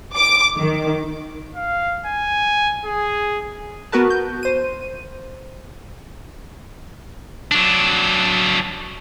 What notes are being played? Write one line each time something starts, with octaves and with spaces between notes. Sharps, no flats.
D6
D#3
F5
G#5
G#4
B3 F#4 A#4 B4 A5
G6
C5 D#7
F#3 D4